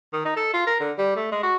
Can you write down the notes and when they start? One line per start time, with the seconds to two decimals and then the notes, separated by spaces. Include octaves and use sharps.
0.13 D#3
0.25 D#4
0.37 A4
0.53 F4
0.67 A#4
0.80 D3
0.98 G3
1.16 A3
1.32 G#3
1.43 F#4